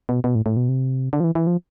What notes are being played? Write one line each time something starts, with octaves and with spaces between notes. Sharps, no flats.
B2
B2
A2
A2
B2
C3
D3
F3
E3
E3
F3